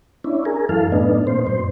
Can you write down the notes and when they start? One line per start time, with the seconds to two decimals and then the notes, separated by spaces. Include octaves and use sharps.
0.24 C#4 D4 E4
0.45 G#4 A#4
0.69 F#2 E3 A4 F5
0.92 A2 B3 D4 D#4
1.27 A#2 C4 C5
1.46 F#2 C5